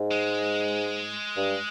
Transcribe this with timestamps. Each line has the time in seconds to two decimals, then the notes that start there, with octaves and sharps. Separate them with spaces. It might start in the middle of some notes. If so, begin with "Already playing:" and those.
Already playing: G#2
0.11 G#3
1.37 G2